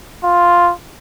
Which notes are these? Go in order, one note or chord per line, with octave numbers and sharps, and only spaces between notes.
F4